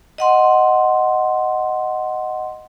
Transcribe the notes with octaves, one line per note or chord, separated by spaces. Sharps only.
D#5 F#5 C6